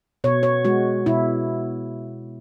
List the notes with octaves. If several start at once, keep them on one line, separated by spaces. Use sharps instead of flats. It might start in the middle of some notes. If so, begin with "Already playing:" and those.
B2 C#5
C#5
G#3 F#4
B2 E4